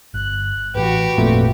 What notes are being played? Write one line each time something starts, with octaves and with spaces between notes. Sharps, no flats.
G1 F#6
A1 A2 E3 F#4 G4 B4
G#1 F2 A#2 A3